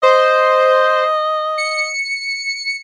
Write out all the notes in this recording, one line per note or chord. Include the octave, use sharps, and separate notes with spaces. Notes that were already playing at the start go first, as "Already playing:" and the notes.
C5 D#5
C#7